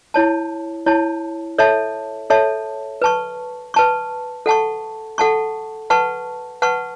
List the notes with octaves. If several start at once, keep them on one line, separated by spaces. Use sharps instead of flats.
E4 C#5 A5
E4 C#5 A5
A4 C#5 E5 A5
A4 C#5 E5 A5
B4 A5 C#6
B4 A5 C#6
A4 F#5 A5 C#6
A4 F#5 A5 C#6
B4 F#5 A5 C#6
B4 F#5 A5 C#6